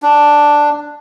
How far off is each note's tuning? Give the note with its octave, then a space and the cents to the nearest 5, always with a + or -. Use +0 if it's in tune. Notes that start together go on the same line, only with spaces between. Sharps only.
D4 +0